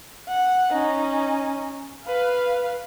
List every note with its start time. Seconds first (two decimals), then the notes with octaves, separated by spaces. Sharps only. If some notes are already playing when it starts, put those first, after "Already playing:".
0.28 F#5
0.72 C#4 D#4
2.05 B4 F5